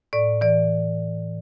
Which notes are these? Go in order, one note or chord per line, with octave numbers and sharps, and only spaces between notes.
A2 D5
E3 D5